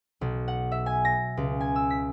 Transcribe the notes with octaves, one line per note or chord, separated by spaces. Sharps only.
B1
F#5
E5
G#5
A#6
C#2
G#5
E6
B6